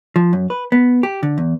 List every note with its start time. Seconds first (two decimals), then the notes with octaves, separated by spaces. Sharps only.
0.16 F3
0.33 F#2
0.50 B4
0.72 B3
1.03 G4
1.23 D3
1.38 E2